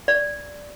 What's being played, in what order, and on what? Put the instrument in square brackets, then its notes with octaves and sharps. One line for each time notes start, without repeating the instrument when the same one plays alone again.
[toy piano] D5